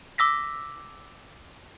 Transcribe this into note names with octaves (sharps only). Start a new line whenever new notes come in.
D6 E6 A#6 B6